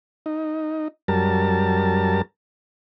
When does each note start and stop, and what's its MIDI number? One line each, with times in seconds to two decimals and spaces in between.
0.26 0.88 63
1.08 2.22 42
1.08 2.22 55
1.08 2.22 70
1.08 2.22 81